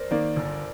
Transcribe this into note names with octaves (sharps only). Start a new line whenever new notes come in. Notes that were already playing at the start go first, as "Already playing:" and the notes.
Already playing: A#4 C5 D5
D#3 A#3 D5
G1